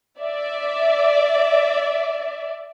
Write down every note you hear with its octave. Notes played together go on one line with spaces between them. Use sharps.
D5 E5